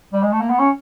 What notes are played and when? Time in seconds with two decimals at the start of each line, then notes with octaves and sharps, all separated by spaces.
0.13 G3
0.22 G#3
0.32 A3
0.40 A#3
0.50 B3
0.59 C#4